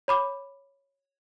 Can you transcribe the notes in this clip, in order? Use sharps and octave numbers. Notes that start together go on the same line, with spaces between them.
C#5 B5 D6